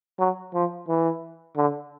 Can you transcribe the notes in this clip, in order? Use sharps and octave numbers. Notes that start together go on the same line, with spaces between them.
F#3
F3
E3
D3